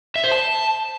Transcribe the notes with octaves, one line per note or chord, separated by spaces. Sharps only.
E5
C5
A5